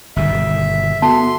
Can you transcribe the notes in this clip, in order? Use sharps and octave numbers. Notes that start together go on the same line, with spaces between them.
G1 B2 D#3 E5
B3 F#4 A4 A5 C6